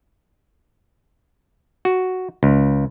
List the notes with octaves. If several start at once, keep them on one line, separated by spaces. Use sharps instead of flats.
F#4
C#2